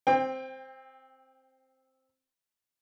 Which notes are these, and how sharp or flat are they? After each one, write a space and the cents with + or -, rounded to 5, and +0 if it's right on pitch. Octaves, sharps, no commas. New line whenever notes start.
C4 +0 G5 +30